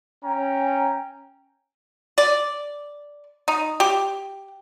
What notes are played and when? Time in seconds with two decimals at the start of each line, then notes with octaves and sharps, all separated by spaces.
0.24 C#4 G5 G#5 A#5
2.18 D5
3.48 D#4
3.80 G4